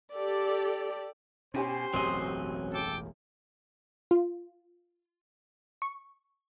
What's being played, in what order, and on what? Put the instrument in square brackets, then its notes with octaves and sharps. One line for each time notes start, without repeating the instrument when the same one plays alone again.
[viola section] G4 A4 D5
[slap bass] B2 [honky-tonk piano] C#4 G4 G#5 [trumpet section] C5 C6
[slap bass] E1 A1 F#2 [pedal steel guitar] F#3 C4 D#5
[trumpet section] A4 G5 D6
[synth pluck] F4
C#6